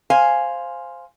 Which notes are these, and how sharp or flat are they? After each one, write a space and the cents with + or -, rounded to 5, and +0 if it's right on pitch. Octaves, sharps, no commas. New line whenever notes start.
C5 +0 F5 +0 G#5 +0